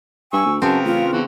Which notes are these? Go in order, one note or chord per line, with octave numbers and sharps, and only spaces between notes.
G2 G#5 C#6 E6
D2
F#2 C#3 B3 C4 A#4 A5
A1 F4
E2 D3 F#4